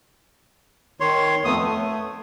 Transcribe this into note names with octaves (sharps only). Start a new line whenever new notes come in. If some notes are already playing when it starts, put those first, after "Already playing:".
D#3 C#5 C6
F2 A3 B3 D#6
A3